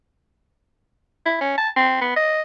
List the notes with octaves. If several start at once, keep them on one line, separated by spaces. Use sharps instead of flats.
E4
C#4
A5
C4
B3
D#5